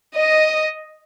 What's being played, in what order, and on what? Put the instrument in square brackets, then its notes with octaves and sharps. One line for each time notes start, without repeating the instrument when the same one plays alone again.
[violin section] D#5